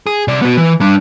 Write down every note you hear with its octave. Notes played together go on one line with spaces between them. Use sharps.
G#4
C3 D5
B3 F#4
E3
G3 D4